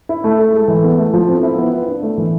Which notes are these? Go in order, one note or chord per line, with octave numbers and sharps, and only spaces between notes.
E4
A3
A4
G#3
E3
B3
A3
F3
C4
E4
B3
B4
D4
A3
E3